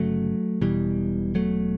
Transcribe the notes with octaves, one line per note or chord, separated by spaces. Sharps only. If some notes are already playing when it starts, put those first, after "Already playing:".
Already playing: G1 C#3 F#3 A3
E1 E2 B2 E3 G3
F#3 A3